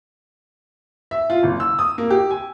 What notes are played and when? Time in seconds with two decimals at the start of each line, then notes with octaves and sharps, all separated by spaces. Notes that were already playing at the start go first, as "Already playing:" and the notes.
1.11 E5
1.30 F4
1.43 F#1
1.60 E6
1.79 D#6
1.98 A#3
2.10 G4
2.31 G#5